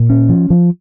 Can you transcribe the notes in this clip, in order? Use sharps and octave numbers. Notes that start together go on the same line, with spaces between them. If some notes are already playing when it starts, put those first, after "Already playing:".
Already playing: A#2
C#4
F3
F3